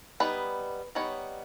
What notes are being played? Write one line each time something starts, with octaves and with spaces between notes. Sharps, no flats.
G3 B3 D#4 B4
G3 B3 D#4 C#5